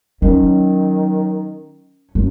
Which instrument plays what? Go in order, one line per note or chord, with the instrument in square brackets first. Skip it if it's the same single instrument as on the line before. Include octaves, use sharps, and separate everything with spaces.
[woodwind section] D#3 F#3 [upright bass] C#4
[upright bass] F#2